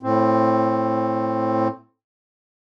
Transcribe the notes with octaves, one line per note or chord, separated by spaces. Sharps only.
A2 C4